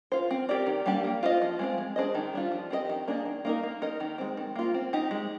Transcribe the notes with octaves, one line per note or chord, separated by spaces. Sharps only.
F4 C5
C4
G4 A#4 D5
D#3
G3 A#3 D4 G4
A#3
F4 C5 D#5
F3
G#3 C4 F4
G#3
D4 G#4 C5 D#5
D#3
G3 D4 F4
F3
C4 G4 A#4 D#5
D#3
A#3 D4 G#4 D#5
D#3
A#3 D#4 A#4
A#3
D#4 A#4 D#5
D#3
G#3 C4
D#3
A#3 F4
C4
D#4 G4
G#3